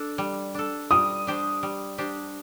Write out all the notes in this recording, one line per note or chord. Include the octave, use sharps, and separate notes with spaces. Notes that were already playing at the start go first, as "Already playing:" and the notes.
Already playing: D4 A4
G3
D4 A4
G3 D#6
D4 G4 C5
G3
D4 G4 C5